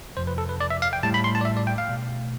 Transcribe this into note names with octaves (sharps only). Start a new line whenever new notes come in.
F2 C3 F3 C5
B4
A4
B4
D5
E5
F5
G5
A2 G3 A5
B5
C6
A5
D5
E5
D5
G5
F5
B2 A3